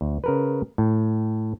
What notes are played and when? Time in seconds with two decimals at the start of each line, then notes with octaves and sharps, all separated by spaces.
0.01 D2
0.24 C#3 A#4 B4
0.78 A2